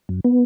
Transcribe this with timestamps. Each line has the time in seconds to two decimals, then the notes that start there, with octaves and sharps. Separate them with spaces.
0.09 F#2
0.24 B3